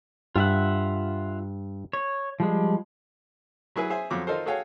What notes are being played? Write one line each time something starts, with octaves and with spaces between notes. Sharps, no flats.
G2 F4 E5 F#5
C#5
F3 G3 G#3
F#3 E4 G#4 B4
G#4 C5 E5 G#5
F2 F3 F#3 D6
D#3 D#4 F4 A4 A#4 C5
F#4 G#4 A4 C#5 F5 G5